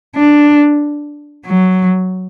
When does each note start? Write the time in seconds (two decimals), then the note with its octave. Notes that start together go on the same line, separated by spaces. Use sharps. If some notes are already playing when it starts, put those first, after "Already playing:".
0.16 D4
1.46 F#3